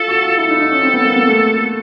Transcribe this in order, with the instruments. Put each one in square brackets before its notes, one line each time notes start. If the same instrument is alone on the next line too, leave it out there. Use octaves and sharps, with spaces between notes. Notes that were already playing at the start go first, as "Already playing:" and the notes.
Already playing: [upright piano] F4 [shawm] A4
[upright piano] F#4
F4
[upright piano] E4 [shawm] A4
[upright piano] D#4
D#4
C#4
C4
B3
A#3
B3
A3